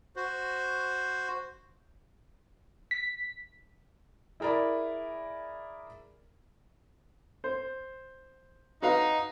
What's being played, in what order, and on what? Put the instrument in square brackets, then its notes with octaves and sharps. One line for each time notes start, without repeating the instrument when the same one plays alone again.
[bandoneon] F#4 C5
[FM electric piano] B6
[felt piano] E4 G#4 A#4 D5 B5
[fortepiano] C5
[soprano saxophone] D#4 [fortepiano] F#4 B4 F5